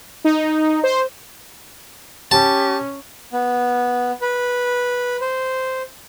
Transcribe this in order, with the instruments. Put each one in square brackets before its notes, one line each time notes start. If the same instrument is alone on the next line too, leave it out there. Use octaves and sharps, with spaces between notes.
[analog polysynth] D#4
C5
[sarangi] C#4 [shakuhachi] G4 [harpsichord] A5
[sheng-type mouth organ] B3
B4
C5